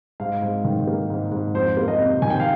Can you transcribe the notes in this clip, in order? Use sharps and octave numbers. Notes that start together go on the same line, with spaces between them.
G#2 F5
G#2
D#3
A#3
G#2
G#2
F2 C5
A#3
D#5
C3
D#3 G#5
G5
F5